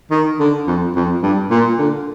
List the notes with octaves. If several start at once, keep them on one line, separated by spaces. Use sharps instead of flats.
D#3
D3
F2
F2
G2
A#2
D3